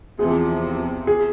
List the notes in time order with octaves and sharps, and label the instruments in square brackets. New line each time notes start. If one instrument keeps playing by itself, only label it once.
[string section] E2 C3 F3 [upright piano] G#4
[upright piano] G#4